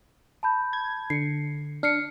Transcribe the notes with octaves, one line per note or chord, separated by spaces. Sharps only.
A5 B5 G6
G#6
D3 C7 C#7
D4 F6 C7 C#7